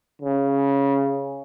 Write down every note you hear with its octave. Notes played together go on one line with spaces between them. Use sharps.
C#3